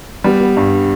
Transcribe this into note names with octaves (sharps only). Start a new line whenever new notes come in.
G3 B3
B3
G2